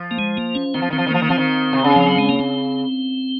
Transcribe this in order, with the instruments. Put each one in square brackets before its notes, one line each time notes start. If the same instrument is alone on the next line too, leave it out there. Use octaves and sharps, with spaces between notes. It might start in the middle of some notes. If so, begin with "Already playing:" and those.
Already playing: [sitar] F3
[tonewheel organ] A#3
G#3
A#3
C#4
[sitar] D#3 [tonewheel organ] C4
[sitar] F3
D#3
[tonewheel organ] C4
[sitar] F3
D#3
[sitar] F3 [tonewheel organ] A#3
[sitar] D#3
[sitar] F3 [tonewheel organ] C4
[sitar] D#3
C3
C#3
[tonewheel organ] F3
F#3
G#3
A#3
C4